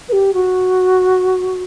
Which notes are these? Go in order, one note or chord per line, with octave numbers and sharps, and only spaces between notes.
B4
G4
F#4